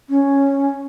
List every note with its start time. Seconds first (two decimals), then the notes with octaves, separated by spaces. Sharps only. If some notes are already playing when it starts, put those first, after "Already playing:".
0.09 C#4